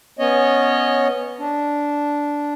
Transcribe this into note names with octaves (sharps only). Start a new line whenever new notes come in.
B3 C#4 C#5 D#5
D4